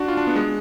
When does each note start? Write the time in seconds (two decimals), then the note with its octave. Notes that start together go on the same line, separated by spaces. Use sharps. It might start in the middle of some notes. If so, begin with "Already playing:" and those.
Already playing: D4 F#4
0.08 F4
0.17 D4
0.27 B3
0.36 G#3